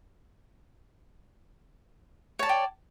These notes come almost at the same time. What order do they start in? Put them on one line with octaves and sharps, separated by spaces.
C#5 A5 D5 G5